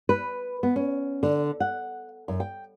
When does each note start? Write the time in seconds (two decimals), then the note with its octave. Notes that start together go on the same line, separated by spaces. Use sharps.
0.09 B4
0.63 B3
0.76 C#4
1.23 D3
1.60 F#5
2.28 F#2
2.40 G5